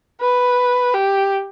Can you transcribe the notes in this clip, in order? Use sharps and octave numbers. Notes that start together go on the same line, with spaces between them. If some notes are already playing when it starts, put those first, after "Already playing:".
B4
G4